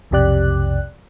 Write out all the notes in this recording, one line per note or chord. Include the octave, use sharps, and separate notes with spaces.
B1 F2 C3 G4 D5 F#6